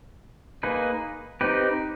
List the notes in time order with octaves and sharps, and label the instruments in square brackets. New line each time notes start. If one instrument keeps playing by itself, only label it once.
[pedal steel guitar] A#3 D#4 G#4 B4
C4 D#4 G4 B4